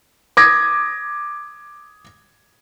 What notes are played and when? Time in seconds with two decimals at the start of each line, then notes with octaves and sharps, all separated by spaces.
0.37 D6 D#6 G#6 A#6